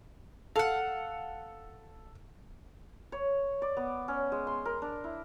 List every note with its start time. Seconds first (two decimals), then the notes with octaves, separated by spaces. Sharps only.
0.56 A4 F5 F#5
3.12 C#5
3.62 D5
3.77 B3
4.08 C#4
4.32 G#3
4.47 C6
4.65 A#4
4.82 D4
5.04 E4